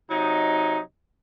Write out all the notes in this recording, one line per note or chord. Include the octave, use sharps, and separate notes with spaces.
C3 F#3 D#4